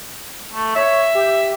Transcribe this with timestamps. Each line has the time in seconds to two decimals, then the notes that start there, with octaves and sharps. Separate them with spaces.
0.53 A3
0.75 C#5 E5
1.15 G4